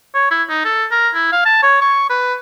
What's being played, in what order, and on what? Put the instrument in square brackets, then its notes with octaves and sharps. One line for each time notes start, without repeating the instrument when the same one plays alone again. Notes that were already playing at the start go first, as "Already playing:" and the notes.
[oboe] C#5
E4
D#4
A4
A#4
E4
F5
A5
C#5
C#6
B4